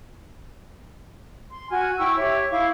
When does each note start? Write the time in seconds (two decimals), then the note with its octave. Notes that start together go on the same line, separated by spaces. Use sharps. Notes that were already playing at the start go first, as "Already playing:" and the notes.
1.51 C6
1.70 F#4 G#5 F6
1.97 E4 G5 C#6 E6
2.16 G4 C#5 E5
2.50 E4 F5 C#6 D6